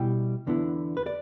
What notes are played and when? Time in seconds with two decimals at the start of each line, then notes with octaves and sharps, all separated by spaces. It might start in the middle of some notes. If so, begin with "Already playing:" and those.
Already playing: B2 G3 E4 G5
0.47 E2 D3 B3 E4
0.97 B4
1.06 D5